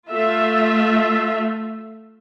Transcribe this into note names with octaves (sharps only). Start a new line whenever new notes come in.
A3 F4 E5